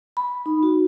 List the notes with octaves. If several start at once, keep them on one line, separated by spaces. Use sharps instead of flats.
B5
D#4
F#4